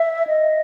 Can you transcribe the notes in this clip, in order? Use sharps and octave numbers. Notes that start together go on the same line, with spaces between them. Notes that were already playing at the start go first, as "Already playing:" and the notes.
Already playing: E5
D#5